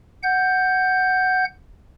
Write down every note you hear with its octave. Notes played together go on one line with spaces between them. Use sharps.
F#5 G6